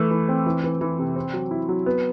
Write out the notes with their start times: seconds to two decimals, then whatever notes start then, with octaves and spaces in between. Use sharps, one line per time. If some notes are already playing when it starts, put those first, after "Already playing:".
Already playing: E3 A3
0.11 E3
0.29 C4
0.46 E3
0.64 E3
0.81 E3
0.99 C3
1.16 C4
1.33 F#3
1.51 E4
1.69 F#3
1.86 B3